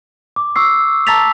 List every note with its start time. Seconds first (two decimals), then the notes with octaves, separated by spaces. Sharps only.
0.36 D6
0.56 C#6 E6 C7
1.07 A5 A#5 E6 A6 B6 F7